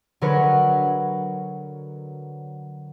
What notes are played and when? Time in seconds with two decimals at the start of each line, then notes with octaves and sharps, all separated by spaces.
0.21 D3 F#3 A#4 B4 C#5